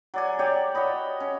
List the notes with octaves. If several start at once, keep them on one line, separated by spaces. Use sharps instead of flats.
F#3 D5 G#5
G4 C#5 D5 G5
F#4 C#5 D#5 B5
C#4